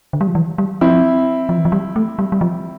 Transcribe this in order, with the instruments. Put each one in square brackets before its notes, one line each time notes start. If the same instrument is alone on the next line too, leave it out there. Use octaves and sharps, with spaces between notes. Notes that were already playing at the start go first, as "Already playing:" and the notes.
[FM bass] D3
G3
F3
E3
G3
[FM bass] F3 [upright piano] C4 E4
[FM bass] F3
E3
F3
G3
A3
G3
G3
F3